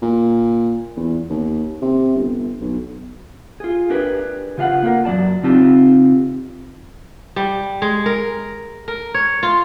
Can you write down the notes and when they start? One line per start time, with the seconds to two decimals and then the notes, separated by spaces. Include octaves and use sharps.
0.02 A#2
0.97 E2
1.30 D#2
1.82 C3
2.16 G1
2.61 B1
3.60 F4 G#4
3.90 D4 G4 G#4 A#4 B4
4.58 C#3 F4 F5 F#5
4.83 A#3 F4 G4 A#4
5.05 F#2 F#3 G#3 D5 A5
5.43 C#3 C4 D#4 F4 G4 A5
7.36 G3
7.82 G#3
8.06 A#4
8.88 A#4
9.14 C#5
9.43 F4